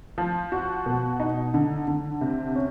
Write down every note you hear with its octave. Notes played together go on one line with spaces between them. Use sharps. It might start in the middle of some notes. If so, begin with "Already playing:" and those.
F3
F#4
B2
D#4
D3
D3
C3
C#4